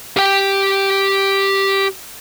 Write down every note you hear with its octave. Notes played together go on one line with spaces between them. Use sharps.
G4 G5